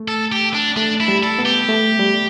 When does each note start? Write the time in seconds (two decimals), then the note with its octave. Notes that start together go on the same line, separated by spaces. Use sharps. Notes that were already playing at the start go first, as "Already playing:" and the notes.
Already playing: A3
0.08 A4
0.32 G4
0.54 D4
0.76 A3 D4
1.00 E4
1.08 G3
1.23 A4
1.39 B3
1.46 G4
1.69 A3
1.99 G3